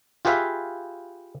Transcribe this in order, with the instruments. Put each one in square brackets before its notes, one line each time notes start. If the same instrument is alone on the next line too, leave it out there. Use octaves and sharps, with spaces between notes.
[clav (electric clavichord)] F4 G4 G#4 B4 E5 F5